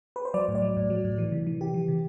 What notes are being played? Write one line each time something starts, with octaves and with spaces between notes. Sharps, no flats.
B4
C5
F#3 D5
A2
D5
F#3
A2
F#3
A2
E3
C3
E3
C3 G4
E3
C3